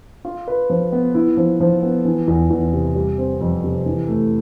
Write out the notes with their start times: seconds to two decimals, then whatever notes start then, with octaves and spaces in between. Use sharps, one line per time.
0.25 F4
0.48 B4
0.70 F3
0.92 B3
1.15 E4
1.37 F3
1.60 F3
1.83 B3
2.05 E3
2.28 E2
2.50 E2
2.73 C3
2.95 G3
3.18 C4
3.41 F2
3.64 C3
3.86 E3
4.08 A3